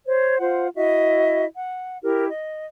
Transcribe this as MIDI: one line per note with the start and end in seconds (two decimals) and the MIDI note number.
0.06 0.38 72
0.06 0.38 73
0.39 0.68 65
0.39 0.68 72
0.39 0.68 78
0.75 1.45 64
0.75 1.45 66
0.75 1.45 75
0.75 1.45 76
1.55 1.97 78
2.03 2.28 64
2.03 2.28 67
2.03 2.28 70
2.30 2.65 75